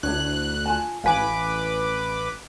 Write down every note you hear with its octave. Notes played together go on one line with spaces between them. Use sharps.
D2 D4 E4 C#5 F#6
F4 G#5 A5
A1 B4 F5 G#5 B5 D6